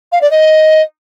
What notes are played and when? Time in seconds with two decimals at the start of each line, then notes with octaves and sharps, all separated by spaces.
0.12 F5
0.21 D5
0.30 D#5